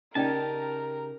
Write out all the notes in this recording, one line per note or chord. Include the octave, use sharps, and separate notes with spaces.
C#3 C#4 D#4 G4 A#4 D5 G5 A5